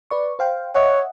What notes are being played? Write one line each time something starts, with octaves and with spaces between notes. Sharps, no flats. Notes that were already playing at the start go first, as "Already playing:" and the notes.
B4 D5 C#6
C5 F5 G5
C#5 D#5 E5 F#5